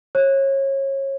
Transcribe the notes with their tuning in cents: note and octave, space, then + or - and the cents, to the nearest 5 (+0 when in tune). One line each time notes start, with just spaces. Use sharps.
C#5 -25